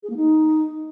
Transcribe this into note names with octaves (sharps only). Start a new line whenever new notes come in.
G#4
A#3
D#4